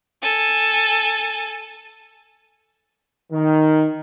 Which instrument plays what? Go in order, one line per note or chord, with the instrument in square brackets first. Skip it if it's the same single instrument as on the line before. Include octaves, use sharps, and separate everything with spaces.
[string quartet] A4 G#5
[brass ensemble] D#3